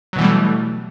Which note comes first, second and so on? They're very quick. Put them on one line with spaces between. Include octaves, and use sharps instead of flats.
F#3 B2 E3 G3 A3